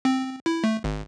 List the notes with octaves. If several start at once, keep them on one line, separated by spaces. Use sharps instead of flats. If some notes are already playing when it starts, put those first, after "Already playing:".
C4
E4
A3
G#1